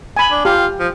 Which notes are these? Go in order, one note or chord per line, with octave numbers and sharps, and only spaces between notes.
G#5 B5
D4
F4 G4
F3